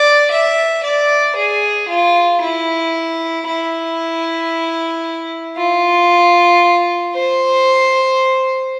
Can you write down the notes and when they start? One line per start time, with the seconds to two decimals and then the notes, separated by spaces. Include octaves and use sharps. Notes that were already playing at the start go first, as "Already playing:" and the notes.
Already playing: D5
0.31 E5
0.83 D5
1.36 G#4
1.88 F4
2.41 E4
3.47 E4
5.57 F4
7.14 C5